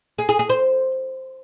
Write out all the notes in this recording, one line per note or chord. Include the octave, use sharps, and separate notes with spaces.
G#4
G#4
G#4
C5